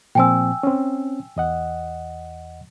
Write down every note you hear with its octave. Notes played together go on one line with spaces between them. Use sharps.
A#2 F3 C4 G5 G#5 E6
C4 C#4
E2 D#5 F#5